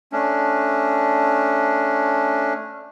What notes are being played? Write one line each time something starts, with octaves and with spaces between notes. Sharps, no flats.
A3 C#4 D4